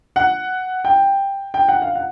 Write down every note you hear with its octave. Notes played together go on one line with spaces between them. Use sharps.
F#5
G5
G5
F#5
F5
F#5